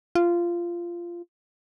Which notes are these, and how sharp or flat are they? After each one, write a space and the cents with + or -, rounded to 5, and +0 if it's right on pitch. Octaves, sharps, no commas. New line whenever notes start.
F4 -15